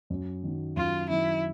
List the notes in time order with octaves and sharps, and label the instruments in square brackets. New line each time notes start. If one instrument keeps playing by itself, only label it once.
[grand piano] F#2
D#3 F#3
[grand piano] F#2 [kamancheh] F4
[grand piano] D#3 F#3 [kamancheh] E4